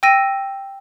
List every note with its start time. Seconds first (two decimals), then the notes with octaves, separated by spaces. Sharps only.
0.03 G5 E6 A#6 D#7